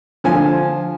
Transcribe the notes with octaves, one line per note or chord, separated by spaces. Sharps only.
D3 F3 G#5